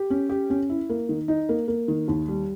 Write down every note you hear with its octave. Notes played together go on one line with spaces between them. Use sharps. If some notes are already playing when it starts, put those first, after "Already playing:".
Already playing: G4
C#4
G4
C#4
E4
A#3
D#3
D#4
A#3
A#3
D#3
D#2
G3